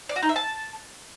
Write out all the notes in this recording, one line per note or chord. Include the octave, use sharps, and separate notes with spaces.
D5
F#4
D#4
E5
A5